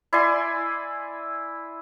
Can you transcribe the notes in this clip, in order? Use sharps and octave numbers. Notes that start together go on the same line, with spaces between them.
E4 D5 G#5 C6